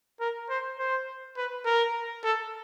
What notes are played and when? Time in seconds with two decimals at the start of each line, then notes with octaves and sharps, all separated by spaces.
0.20 A#4
0.50 C5
0.79 C5
1.37 B4
1.65 A#4
2.24 A4